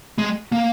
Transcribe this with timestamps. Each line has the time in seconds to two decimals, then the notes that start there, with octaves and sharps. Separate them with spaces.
0.18 G#3
0.52 A#3